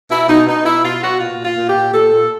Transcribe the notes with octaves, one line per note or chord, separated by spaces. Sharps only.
B2 E4
B2 D#4
B2 D#4
B2 E4
B2 F4
B2 F#4
A#2 F4
A#2
F4
A#2
G4
A#2
A#2 A4
A#2